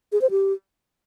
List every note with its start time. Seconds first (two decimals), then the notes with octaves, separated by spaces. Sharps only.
0.12 G#4
0.21 C5
0.31 G4